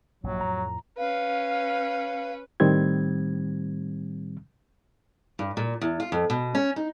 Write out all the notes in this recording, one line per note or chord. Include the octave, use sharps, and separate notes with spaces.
A#1 G2 A#2 F#3
F2 A2 A#5
C#4 B4 F5
A2 D#3 G3 C4 G#6
G2
A#2
E2
F4
F2
B2
C#4
D#4